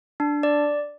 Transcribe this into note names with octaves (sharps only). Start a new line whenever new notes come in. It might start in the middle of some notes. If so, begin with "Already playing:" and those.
D4
D5